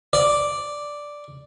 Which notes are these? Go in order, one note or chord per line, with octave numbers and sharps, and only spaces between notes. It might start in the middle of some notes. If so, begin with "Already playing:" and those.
D5